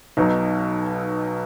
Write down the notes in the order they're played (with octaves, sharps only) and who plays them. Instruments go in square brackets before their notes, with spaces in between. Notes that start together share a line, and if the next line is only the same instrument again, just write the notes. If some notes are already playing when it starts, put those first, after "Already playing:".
[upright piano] B1 B2 F#3 D#4